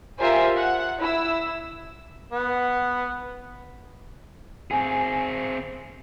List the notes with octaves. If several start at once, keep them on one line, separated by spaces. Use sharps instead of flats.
F4 G4 A#4 C5 E5 G#5
F#5
E4 E6
B3 F#5
C4 G#4 G#5